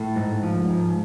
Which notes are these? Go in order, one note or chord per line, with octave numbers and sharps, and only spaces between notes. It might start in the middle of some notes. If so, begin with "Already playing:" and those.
Already playing: A2 A4
G#2
F3
G#2